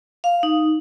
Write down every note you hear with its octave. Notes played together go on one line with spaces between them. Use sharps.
F5
D#4